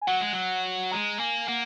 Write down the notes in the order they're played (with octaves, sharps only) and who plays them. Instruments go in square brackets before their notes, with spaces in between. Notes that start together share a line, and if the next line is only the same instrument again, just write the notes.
[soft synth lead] G#5
[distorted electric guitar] F#3 [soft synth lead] F#5
[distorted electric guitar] G#3
F#3
[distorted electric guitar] G#3 [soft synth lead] A#5
[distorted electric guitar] A#3 [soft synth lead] G#5
[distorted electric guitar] A#3 [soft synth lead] F#5